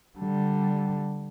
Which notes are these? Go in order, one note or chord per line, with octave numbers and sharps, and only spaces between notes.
D3 G3